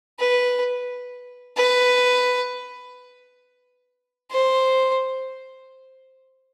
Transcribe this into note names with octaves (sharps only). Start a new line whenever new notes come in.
B4
B4
C5